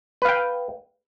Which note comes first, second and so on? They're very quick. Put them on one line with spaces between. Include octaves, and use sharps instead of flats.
B4 F5 G5